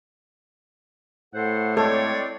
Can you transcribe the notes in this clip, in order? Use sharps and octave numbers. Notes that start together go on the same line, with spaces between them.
A2 A4 C5 F#5
G#3 C4 A4 C#5 D5